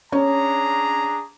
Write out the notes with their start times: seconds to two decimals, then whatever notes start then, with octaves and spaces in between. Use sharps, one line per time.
0.12 C#4 D4 G#4 A#5